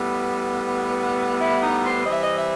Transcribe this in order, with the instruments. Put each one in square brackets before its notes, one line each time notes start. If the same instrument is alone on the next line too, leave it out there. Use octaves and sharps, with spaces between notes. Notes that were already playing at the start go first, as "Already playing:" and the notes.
Already playing: [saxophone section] A2 G3 B3
E4
D#4
C5
E3 G3 C4 D#5
E5
D#5
E5